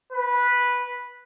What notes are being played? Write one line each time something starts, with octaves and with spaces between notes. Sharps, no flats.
B4